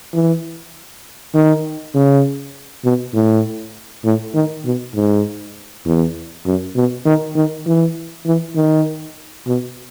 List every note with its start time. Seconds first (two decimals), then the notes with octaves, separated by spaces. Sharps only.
0.14 E3
1.34 D#3
1.94 C#3
2.84 B2
3.14 A2
4.05 A2
4.34 D#3
4.65 B2
4.95 G#2
5.85 E2
6.46 F#2
6.76 B2
7.05 D#3
7.35 D#3
7.66 E3
8.26 E3
8.56 D#3
9.47 B2